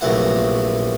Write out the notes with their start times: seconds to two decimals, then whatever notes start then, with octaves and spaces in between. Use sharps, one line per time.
0.01 A#1 F#2 C3 E3 A3 F#5